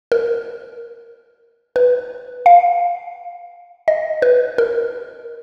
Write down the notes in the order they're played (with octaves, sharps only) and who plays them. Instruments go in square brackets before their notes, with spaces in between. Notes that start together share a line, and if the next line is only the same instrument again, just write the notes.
[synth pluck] A#4
B4
F5
D#5
B4
A#4